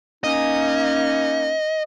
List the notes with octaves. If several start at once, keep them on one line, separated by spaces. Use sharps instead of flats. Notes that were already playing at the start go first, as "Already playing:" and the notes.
A#3 C#4 D#4 D#5